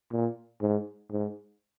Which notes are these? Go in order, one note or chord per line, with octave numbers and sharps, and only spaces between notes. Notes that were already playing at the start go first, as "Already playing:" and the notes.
A#2
G#2
G#2